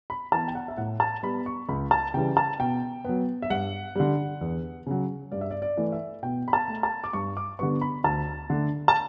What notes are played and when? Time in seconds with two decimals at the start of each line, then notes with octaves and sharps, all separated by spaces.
0.10 B5
0.32 E3 B3 A5
0.48 G5
0.55 F#5
0.68 E5
0.77 A2 F#5
1.00 A5
1.23 G3 B3 B5
1.46 C#6
1.69 C#2 B5
1.91 A5
2.14 C#3 E3 G3 G5
2.37 A5
2.59 B2 G5
3.05 F#3 B3
3.42 E5
3.50 G2 F#5
3.96 D3 G3
4.41 E2
4.87 C#3 F#3
5.32 G2 D5
5.41 E5
5.51 D5
5.62 D5
5.77 E3 A3
5.92 E5
6.23 B2 G5
6.48 B5
6.53 A5
6.68 A3
6.83 A5
7.04 D6
7.13 G2 C#6
7.37 D6
7.59 D3 G3 B3 C#6
7.81 B5
8.04 D2 A5
8.50 D3 A3
8.88 A5